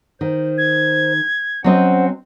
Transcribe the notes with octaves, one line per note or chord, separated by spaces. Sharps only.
D#3 C5
G#6
F#3 C4 C#4 C5 D#5 F#5